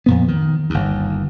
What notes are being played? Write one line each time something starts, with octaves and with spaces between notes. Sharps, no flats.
F2 A#2 B3
D#3
G1 D#2